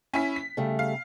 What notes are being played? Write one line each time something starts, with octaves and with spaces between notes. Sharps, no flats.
C#4 E4 B6
B6
C#3 G3 A3
F5